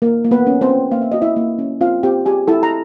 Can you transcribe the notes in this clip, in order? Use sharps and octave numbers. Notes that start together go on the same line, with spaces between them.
A#3 A#4
A#3
B3 B4
C#4
C4 C5
C#4
A#3 F5
E5
F#4 D#5
E4 E5
A#3
C#4
C4 F4 F5
C4 G4 G5
G4 G#4 G#5
E4 A4 A5
A#5